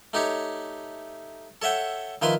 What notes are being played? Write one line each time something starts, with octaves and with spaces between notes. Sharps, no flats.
A3 D#4 G4 C#5
A4 C#5 E5 F#5 G5
D#3 F3 E4 B4 C6